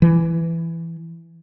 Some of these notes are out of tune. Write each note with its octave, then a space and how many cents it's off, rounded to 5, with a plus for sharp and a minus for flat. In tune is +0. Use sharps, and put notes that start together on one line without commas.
E3 +10